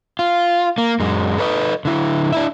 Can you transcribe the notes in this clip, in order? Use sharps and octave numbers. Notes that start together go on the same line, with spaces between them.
F4
A#3
F#2 G#3
A4 B4 C#5 D#5
D3 E4
D4 E4 E5